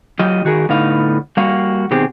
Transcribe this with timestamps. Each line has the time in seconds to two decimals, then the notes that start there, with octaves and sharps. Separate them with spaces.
0.19 F#3 F4 G4 D#5
0.45 D#3 F#4 G#4 A#4
0.69 A2 D3 B3 D#4 F5
1.37 G3 A#3 F#4 F5
1.91 B2 D#3 C4 G4 G#4